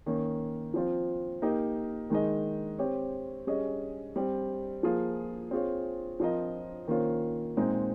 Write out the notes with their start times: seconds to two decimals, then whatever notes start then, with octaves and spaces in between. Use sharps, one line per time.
0.06 D#3 A#3 C#4
0.74 F3 C4 F4
1.42 A#3 D#4 G4 A#4 D#5
2.10 D#3 G#3 D#4 G#4 D#5
2.79 C4 G4 C#5
3.47 G3 C#4 G#4 D#5
4.16 G3 C4 G4
4.83 F3 A#3 F4 G#4
5.51 C4 F4 G#4 C#5
6.20 F3 C4 F4 A#4 D#5
6.88 D#3 A#3 C#4 F4 C5
7.57 A#2 G#3 C4 D#4